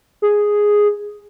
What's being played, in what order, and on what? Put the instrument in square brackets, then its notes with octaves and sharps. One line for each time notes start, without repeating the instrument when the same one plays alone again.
[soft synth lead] G#4